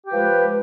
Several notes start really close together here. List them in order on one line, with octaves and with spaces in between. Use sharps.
G4 F3 B4 G#3